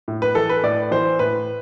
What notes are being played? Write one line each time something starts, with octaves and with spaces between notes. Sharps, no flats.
A2
B4
E3 A4
B4
A2 D5
E3 C5
A2 B4